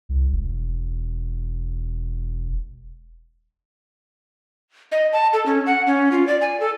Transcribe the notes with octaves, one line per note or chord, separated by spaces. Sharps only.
C2
E1
D#5
A5
A4
C#4
F#5
C#4
F4
D5
G#5
A4